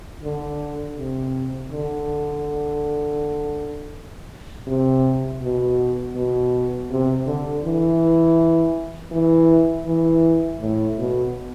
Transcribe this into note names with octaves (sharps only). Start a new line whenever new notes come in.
D3
C3
D3
C3
B2
B2
C3
D3
E3
E3
E3
A2
B2